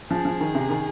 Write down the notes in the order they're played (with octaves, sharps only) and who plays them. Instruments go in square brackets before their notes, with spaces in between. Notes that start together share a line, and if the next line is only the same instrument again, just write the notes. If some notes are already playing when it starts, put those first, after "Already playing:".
[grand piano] F3 [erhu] G#4
[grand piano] F3
D#3
C3
D#3